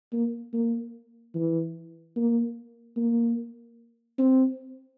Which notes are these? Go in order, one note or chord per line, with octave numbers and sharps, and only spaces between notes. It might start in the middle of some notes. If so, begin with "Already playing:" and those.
A#3
A#3
E3
A#3
A#3
C4